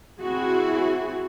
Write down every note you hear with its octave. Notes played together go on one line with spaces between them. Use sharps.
C4 E4 F#4 G#4